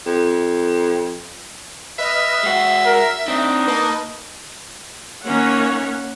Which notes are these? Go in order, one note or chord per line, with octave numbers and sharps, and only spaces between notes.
F2
B4 D#5 E5 F6
G#3 F#4 C7
A#4
C4 D4 D#4 D7
A#3 B4 D#5 A5
D#3 A#3 C#4 C#5 F#5